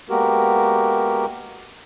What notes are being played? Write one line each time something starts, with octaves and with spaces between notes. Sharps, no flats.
G#3 A#3 B3 F#4 G4 A#4